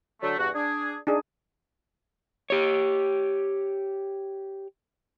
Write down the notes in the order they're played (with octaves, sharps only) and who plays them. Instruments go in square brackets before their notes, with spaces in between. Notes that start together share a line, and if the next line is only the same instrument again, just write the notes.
[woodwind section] D3 F#3 A3
E2 G2 F#4
D4 G#4
[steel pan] D4 D#4 G#4
[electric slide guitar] G4 C#5